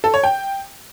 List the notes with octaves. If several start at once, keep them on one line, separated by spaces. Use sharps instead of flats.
A4
C#5
G5